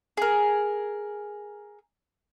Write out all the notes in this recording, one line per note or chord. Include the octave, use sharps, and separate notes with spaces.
G#4 A#4